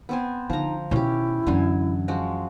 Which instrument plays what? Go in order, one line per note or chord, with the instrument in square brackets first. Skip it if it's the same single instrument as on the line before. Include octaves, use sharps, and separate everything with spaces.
[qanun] B3 C4 G#5
[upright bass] D3 [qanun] F3 A#5 [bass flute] D#4
[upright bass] B2 D#3 [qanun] C#4 G4 [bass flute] E4
[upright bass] F#2 E3 [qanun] D3 G#5
[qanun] F3 G#3 F#4